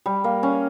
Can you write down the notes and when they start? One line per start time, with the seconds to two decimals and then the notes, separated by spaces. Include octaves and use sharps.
0.06 G3
0.24 A#3
0.43 C#4